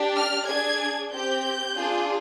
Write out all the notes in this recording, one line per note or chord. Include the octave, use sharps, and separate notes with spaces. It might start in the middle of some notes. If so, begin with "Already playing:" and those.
Already playing: D4 G4
F6
D4 G#4 G#6
C4 G4 G6
D4 F4 G#4